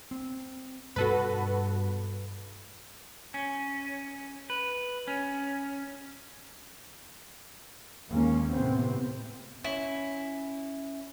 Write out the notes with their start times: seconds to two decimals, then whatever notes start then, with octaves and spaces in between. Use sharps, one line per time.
0.11 C4
0.96 G2 B2 B3 F#4 A4 B4
3.34 C#4
4.50 B4
5.08 C#4
8.09 D#2 G#3 A#3 C#4
8.51 A2 C3 B3 C4
9.64 C#4 E4